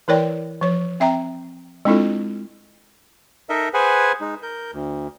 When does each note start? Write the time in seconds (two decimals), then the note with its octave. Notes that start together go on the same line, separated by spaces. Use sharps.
0.08 E3 E4 A#4 C#5 D5 G5
0.61 F3 C#5
1.00 C4 E5 G5 A#5
1.85 G#3 C4 D4 E4 F4 A4
3.49 D#4 A4 A#4 D#5 E5
3.74 G#4 B4 C5 F#5 G#5
4.21 G#3 D#4
4.43 A#4 G6
4.73 D2